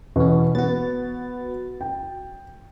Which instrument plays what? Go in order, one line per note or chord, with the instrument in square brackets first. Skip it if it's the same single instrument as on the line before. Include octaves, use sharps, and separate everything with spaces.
[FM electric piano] E2 C#4 [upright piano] B2
[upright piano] B3 [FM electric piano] F#4 A6
[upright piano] G5